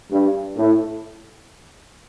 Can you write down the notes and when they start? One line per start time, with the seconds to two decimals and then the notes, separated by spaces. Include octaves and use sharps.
0.12 G2
0.57 A2